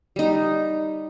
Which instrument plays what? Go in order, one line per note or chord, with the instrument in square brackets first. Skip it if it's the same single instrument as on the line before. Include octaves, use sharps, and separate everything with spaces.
[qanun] G3 D#4